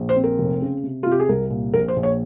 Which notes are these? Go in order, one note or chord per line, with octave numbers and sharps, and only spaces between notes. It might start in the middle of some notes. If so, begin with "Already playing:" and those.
Already playing: A#1
C5
C4
A#4
F1
C#3
C3
C3 F4
G4
G#4
C2 A#4
A#2
A#1 A#4
C5
A#1
C#5